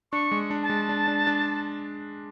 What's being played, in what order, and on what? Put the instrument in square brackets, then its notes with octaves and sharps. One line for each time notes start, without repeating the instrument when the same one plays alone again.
[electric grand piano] D4 [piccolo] C#6
[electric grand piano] G#3
D4
[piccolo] A5
[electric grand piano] G#3
D4
D4
D4